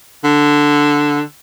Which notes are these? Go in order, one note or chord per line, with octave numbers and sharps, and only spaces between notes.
D3